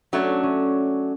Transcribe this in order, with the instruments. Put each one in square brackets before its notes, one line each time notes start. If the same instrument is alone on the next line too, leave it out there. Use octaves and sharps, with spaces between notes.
[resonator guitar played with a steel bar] F#3 A3 D4 [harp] C#4
[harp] C#4